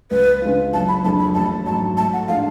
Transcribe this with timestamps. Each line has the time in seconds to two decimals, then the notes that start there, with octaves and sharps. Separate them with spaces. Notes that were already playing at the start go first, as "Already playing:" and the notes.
0.11 C#2 B4
0.42 C#3 G#3 D4 F4
0.73 F#1 A5
0.88 B5
1.05 F2 D3 G#3 A5
1.19 B5
1.35 A1 A5
1.66 G#2 F#3 A5
1.97 A2 A5
2.13 F#5
2.28 F3 G#3 D4 F4 F5